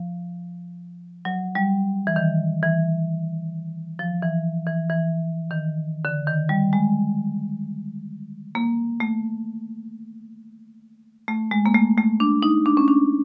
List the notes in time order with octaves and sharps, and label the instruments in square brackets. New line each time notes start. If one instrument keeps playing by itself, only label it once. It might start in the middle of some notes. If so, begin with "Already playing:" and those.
Already playing: [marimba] F3
F#3
G3
E3
D#3
E3
F3
E3
E3
E3
D#3
D3
D#3
G3
G#3
A#3
A3
A3
G#3
A#3
A3
A3
D4
D#4
D4
C#4
D4